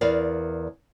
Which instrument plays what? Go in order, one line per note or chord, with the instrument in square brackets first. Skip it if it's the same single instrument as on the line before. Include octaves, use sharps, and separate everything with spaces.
[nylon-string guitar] E2 A#4 D5 F5